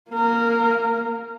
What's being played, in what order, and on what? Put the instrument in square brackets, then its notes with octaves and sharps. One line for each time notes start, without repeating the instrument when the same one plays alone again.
[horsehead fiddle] A#3 A#4